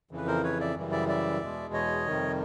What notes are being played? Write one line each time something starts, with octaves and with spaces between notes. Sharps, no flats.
F2 C#3 E3
B4
A#4 C5
B4 C#5
D5 E5
F#2 C#3 E3 G3
D5 E5
D5 E5
E2 B2 G#3
C#5 D#5
F2 C3 D#3 G3